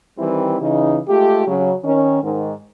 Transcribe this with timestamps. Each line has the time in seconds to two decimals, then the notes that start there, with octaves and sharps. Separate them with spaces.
0.18 D#3 E3 G3 C4 E4 G4
0.61 C#3 E3 D#4
1.08 G#3 A3 F4 G4
1.46 C#3 F#3
1.84 D#3 C#4
2.23 G#2 D#3